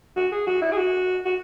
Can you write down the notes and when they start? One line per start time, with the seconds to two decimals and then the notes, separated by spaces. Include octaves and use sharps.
0.17 F#4
0.32 G#4
0.47 F#4
0.62 E4
0.72 G#4
0.77 F#4
1.25 F#4